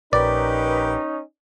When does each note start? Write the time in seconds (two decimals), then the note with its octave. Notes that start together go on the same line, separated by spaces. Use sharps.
0.13 A#1 C#4 D#4 G4 A#4 B4 D5